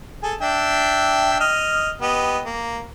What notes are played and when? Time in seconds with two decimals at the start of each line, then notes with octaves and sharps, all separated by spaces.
0.23 G#4 A4
0.41 D4 E5 G5
1.40 D#5 F6
2.01 B3 G4 D#5
2.45 A#3